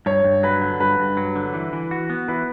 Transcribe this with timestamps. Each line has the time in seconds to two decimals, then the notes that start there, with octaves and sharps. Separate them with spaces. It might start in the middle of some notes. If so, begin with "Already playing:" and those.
0.06 G2 C#5
0.24 G2
0.43 F#3 B4
0.62 D3
0.80 G2 B4
0.99 G2
1.17 F#3
1.36 D3
1.54 E3
1.73 E3
1.91 F#4
2.10 B3
2.28 E3 B4